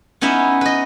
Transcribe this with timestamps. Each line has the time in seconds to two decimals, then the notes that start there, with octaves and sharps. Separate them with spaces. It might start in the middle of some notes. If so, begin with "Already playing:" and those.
0.21 B3 C#4 D#4 E4 E5
0.61 B4 D#5